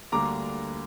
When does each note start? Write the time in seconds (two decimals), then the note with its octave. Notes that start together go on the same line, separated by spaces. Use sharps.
0.12 D2 D3 G3 A#3 D4 A#5 D6